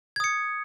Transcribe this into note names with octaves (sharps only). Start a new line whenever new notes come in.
D#6 G#6 C#7